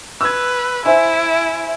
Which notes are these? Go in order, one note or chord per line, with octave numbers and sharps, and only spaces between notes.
B4 E6 G#6
E4 C5 E5 G#5